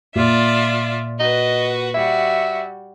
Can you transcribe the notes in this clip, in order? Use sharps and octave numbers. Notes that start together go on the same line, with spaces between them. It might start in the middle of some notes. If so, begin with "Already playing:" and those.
A#2 F4 D5 E5
F#4 B4 D#5
G3 F#4 E5